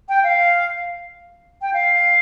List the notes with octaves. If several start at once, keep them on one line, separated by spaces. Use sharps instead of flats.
G5
F5
G5
F5